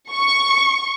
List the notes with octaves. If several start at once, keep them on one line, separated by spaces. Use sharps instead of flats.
C#6